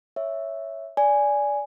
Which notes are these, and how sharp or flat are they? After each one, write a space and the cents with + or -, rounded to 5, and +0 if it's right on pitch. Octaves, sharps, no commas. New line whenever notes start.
C#5 +0 E5 +0
D5 -15 G#5 +0